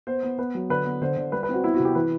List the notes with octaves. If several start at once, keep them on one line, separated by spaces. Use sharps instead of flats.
B3 C5
B3
B3 B4
F#3
D3 B4
B3
D3 C5
D3
G3 B4
B4
C4 F#4
B3 E4
F#4
C3
G4
E3 B4